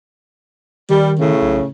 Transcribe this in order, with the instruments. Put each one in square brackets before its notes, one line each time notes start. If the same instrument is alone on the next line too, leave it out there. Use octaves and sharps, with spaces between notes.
[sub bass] D#3 [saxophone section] G3
[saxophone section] A2 C#3
[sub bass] B1